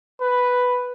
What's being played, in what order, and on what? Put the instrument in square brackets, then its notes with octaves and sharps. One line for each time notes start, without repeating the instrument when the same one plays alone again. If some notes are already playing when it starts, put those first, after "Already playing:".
[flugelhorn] B4